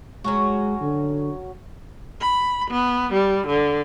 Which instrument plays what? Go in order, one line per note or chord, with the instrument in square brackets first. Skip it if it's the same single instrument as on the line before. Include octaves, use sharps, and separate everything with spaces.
[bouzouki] F#3 C#4 F#4 [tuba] G#3
[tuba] D3
[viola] B5
B3
G3
D3